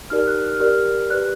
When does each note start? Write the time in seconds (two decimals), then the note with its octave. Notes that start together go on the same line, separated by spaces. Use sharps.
0.10 D#4 G4 A#4 D5 F6
0.27 F#6
0.45 F6
0.60 G4 A#4 D5 F6
1.10 G4 B4 D5 F#6